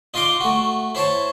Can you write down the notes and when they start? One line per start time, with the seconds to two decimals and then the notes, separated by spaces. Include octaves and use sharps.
0.14 D#4 F4 D#5 C6 D6
0.41 A3 F#4
0.95 E4 C5 C#5 A5